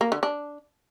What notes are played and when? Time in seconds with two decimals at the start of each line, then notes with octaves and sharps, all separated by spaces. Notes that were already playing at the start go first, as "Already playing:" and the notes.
0.01 A#3
0.12 D3
0.23 D4